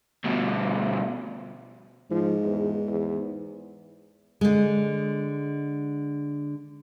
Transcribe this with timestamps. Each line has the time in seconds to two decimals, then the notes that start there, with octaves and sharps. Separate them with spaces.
0.24 D2 B2
2.11 G#2 F3
2.44 E2
2.87 E2
4.41 D3 G#3